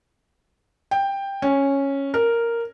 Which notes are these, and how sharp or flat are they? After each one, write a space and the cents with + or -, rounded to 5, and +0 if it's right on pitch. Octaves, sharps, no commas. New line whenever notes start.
G5 +10
C#4 -5
A#4 -5